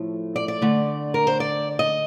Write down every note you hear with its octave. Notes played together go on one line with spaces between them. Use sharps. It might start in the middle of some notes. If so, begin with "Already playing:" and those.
Already playing: A2 F3 A3
D5
D5
D3 A3
A#4
C5
D5
D#5